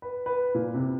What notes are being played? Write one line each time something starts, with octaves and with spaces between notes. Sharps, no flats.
B4
B4
A#2
C3